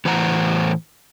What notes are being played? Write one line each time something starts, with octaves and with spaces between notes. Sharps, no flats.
A2 E3 C5 F#5 G5 A#5